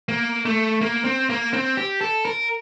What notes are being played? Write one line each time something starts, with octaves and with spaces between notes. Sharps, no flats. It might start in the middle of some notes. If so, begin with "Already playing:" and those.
A#3
A3
A#3
C4
A#3
C4
G4
A4
A#4